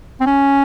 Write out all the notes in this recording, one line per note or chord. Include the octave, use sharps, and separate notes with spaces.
C4
C#4